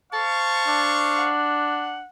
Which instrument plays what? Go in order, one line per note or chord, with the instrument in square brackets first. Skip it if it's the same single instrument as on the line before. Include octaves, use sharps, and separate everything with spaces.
[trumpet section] C5 F5 C#6 [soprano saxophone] A5
[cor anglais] D4
[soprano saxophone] F#5